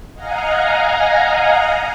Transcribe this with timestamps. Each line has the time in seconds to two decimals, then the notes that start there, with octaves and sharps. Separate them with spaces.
0.14 D#5 F5 F#5 G#5 A#5